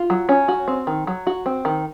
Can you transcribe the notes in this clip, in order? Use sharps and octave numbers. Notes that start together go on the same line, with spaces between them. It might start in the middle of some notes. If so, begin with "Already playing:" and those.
Already playing: F4
F#3
C#4
F#4
C4
D#3
F#3
F#4
C4
D#3